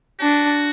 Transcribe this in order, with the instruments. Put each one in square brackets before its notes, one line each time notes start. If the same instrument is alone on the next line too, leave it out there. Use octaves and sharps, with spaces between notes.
[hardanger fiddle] D4 [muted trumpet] F#4